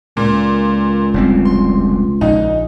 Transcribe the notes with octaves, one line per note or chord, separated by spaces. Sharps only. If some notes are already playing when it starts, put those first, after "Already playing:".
C#2 A#2
F1 G3 C4
C6
A#1 D#4